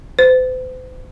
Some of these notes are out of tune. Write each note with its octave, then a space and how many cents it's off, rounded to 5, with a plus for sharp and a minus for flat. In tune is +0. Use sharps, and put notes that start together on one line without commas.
C5 -45